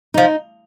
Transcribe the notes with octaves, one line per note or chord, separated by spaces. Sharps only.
F3 D#4